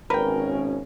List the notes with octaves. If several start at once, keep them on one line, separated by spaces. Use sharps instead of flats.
G#1 B2 C#4 A#4 B4 G5